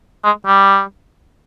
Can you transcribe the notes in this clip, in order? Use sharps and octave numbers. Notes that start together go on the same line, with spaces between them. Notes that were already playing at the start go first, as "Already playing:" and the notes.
G#3
G3